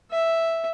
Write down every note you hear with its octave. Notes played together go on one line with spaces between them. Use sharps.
E5